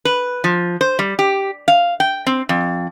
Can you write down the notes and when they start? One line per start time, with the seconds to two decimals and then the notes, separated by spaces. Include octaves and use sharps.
0.05 B4
0.44 F3
0.81 C5
0.99 G3
1.19 G4
1.68 F5
2.00 G5
2.27 C4
2.49 F2